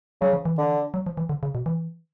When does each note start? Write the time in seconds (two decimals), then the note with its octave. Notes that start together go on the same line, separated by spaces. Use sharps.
0.21 C#3 F#3
0.33 F3
0.45 E3
0.56 D3 D#3
0.66 E3
0.94 F#3
1.07 F3
1.17 E3
1.29 D3
1.43 C#3
1.55 B2
1.66 E3